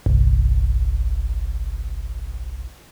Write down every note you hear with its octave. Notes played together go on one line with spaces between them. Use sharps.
G1 C2